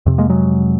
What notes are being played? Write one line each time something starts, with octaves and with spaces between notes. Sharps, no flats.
F2 C3
G#3 A#3
F#3 G#3